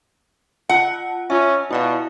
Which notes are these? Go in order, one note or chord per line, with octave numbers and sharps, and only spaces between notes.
F4 F#5 A5
C#4 F4 E5
B2 E4 D5 F5